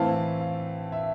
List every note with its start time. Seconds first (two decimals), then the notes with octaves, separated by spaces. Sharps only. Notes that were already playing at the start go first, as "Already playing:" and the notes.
Already playing: A2 E3 A3 C4 F5 A5
0.41 F5
0.92 E5